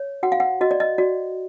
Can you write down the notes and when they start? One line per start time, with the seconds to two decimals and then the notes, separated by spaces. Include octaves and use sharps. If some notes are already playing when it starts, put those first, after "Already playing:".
Already playing: C#5
0.23 F#4 F#5
0.32 F5
0.40 F#5
0.61 F#4 D#5
0.71 D5
0.80 D#5
0.98 F#4 D5